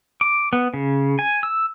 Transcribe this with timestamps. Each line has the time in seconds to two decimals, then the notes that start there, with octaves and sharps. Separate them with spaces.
0.21 D6
0.53 B3
0.74 C#3
1.19 G#5
1.43 E6